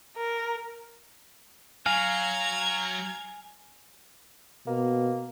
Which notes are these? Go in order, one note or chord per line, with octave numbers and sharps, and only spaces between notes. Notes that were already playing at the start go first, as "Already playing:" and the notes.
A#4
F#3 F5 G#5 A#5 G#6
B2 A#3